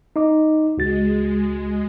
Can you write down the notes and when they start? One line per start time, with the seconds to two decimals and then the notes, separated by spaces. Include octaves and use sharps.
0.16 D#4 D#5 D6
0.78 C#2 G#3 F#4 A6